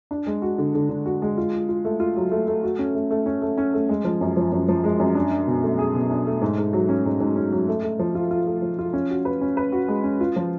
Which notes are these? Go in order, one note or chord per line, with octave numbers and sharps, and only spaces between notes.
D4
G#3
F#4
D3
D3
D3
F#4
G#3
F4
F4
F4
A3
F4
F#3
A3
A3
F#4
C#4
A3
A3
C#4
A3
C#4
A3
G#3
F3
F#2
F3
F#2
F3
G#3
F#2
D4
D4
B2
A3
G#4
B2
D4
A3
G#2
G#2
F#3
C#4
G#2
G#2
C#4
F#3
A3
A3
F3
F4
F4
A3
F3
F4
C#4
F#4
B4
C#4
B4
F#4
G#3
C#4
F4
F3